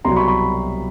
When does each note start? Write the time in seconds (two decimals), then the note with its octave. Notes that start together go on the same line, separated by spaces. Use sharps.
0.04 C2 B2 F#3 A#5 C6
0.16 B5 C#6
0.28 B5 C#6